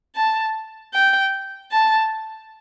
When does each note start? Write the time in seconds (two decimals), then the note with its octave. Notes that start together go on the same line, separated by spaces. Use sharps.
0.16 A5
0.94 G5
1.72 A5